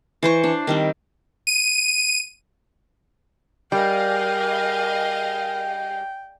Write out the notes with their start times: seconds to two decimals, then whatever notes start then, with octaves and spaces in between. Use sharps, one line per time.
0.23 E3 C5 C#6
0.44 D4
0.67 D#3 G3 C4
1.47 D#7
3.72 G3 G#4 A#4 D#5 F5 G5